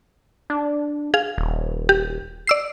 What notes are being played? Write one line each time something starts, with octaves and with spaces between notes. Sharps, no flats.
D4
G#4 F5
D#1
G4
D5 E6 C7